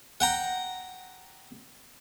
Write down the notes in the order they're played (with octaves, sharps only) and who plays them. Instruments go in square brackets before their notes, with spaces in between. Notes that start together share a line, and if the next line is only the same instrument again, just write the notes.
[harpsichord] F#5 G5 A#5